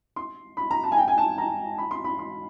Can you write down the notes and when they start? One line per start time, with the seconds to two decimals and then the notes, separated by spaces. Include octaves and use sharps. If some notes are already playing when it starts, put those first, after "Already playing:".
0.16 C6
0.57 B5
0.71 A#5
0.84 A5
0.92 G#5
0.98 G5
1.08 G#5
1.18 A5
1.38 A#5
1.78 B5
1.91 C6
2.04 B5
2.19 C6